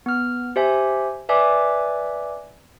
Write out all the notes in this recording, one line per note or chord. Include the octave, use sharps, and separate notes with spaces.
B3 F6
G4 C5 E5 G#5
B4 D5 E5 G#5 D6